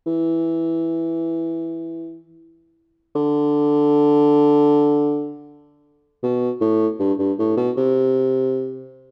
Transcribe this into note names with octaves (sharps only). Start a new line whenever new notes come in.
E3
D3
B2
A2
G2
G2
A2
B2
C3